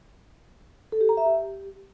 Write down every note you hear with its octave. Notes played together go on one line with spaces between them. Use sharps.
A4
G4
A#5
E5
G4